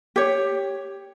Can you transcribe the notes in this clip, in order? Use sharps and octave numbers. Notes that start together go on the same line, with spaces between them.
G4 C#5